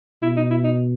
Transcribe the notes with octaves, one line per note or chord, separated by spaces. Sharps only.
B2 E4
D#4
E4
D#4